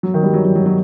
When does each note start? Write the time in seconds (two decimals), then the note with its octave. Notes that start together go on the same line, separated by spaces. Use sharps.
0.03 F#3
0.14 D#3
0.23 G3
0.34 F#3
0.45 F#3
0.56 F#3
0.66 F#3